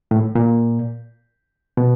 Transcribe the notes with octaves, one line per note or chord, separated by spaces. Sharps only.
A2
A#2
B2